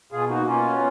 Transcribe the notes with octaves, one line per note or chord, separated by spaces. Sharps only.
B2 F4 G#4
A#3 D#4 F#4
B2 C#4 F4
B3